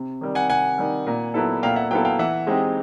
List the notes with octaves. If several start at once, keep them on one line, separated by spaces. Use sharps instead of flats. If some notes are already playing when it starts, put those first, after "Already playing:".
Already playing: C3
D#3 G3
F#5 G#5
C3 F#5 G#5
D#3 G3
A#2
F#3 B3 E4 A4
A#2 F5 G5
E5 F#5
F#3 B3 E4 A4 F5 G5
F5 G5
E3 E5 F#5
G#3 C4 D#4 G4